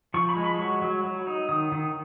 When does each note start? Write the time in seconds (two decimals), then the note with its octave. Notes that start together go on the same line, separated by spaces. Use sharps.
0.14 F3 C#6
0.29 B5
0.36 G#3
0.44 B5
0.59 F#3 C#6
0.82 F#3
1.04 F#3
1.27 D#4
1.49 D#3 D#6
1.72 D#3